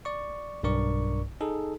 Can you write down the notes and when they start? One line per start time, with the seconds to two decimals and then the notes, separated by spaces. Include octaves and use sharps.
0.05 D5 C#6
0.63 B1 G2 D4 A#4 D5 C#6
1.41 D#4 G#4 A4